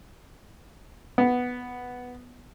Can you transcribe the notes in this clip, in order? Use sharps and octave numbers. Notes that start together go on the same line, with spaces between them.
B3